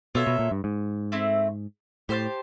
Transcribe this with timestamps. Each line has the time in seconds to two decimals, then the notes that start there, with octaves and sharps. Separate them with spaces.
0.15 B2 F4 A4 C#5 E5
0.27 B2
0.39 A#2
0.51 G2
0.64 G#2
1.12 A3 C4 E4
2.09 A2 G4 C5 F5 A5